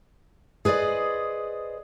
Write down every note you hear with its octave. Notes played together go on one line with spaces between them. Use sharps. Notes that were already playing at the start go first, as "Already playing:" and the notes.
G#4 B4 C5 D5 D#5